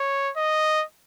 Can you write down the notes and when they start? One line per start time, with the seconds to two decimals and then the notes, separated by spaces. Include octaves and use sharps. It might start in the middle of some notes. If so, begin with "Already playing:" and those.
Already playing: C#5
0.37 D#5